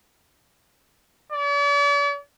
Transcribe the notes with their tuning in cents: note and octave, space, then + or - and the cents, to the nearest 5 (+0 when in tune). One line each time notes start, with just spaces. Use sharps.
D5 -45